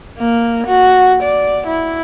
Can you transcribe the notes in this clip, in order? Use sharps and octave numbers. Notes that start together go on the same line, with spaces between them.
A#3
F#4
D5
E4